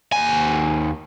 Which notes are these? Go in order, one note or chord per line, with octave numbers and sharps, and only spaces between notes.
D#2 G#5